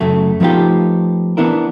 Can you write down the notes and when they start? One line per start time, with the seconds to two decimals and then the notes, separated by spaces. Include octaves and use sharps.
0.01 F#2 C#3 A3
0.40 F3 A3 B3 D#4 F4 G4
1.37 E3 B3 D4 E4 A#4